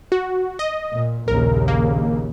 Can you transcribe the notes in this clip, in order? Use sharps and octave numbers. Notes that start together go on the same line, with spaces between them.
F#4
D#5
A#2
A#1 D#2 C#3 A#4
A#3